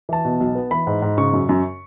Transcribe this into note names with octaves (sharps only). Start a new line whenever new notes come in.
E3 A5
B2
B1
B3
E3 B5
G#2
G#2
C#3 C#6
F#2
F#2